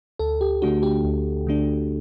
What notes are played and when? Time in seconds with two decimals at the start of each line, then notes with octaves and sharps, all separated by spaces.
0.19 D2 A4
0.41 G4
0.62 D3 A3 D4 F#4
0.83 G4
1.04 D2
1.47 D3 A3 D4